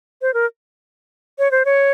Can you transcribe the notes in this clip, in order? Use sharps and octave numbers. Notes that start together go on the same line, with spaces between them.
C5
A#4
C#5
C5
C#5